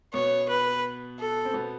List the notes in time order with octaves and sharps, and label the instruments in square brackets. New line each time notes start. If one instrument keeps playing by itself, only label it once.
[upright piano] B2 B3 [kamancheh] C#5
[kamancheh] B4
A4
[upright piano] C4
B2 B3